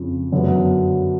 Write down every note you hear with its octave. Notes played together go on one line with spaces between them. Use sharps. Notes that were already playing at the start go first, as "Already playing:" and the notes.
Already playing: F2 C#3 F3
F#2 D3 F#3 B3